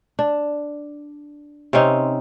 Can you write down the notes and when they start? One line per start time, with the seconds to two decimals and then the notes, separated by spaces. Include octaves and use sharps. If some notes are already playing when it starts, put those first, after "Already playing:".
0.19 D4
1.73 C3 C4 C#4 D#4